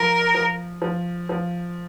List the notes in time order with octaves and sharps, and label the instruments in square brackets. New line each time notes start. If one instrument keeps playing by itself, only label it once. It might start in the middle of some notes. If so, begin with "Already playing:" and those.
Already playing: [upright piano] F3 [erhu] A#4
[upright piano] F3
F3
F3